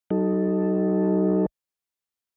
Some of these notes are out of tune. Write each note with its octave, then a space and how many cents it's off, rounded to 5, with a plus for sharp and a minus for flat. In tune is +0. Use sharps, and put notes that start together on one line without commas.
F#3 +40 D#4 +0 A4 +0